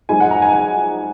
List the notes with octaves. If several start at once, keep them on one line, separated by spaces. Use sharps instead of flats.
G#2 F3 G#3 G#5
F#5
A#5
G#5
G#5